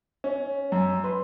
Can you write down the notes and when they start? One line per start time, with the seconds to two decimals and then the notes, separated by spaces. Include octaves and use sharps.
0.24 C#4
0.72 F#2
1.04 B4 C6